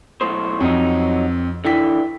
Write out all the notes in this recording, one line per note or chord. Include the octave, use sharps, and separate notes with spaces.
B1 A2 C5
F2 F#3 D#4
D3 E3 E4 G5 B6